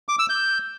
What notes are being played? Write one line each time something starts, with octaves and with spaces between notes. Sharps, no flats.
D6
E6
G6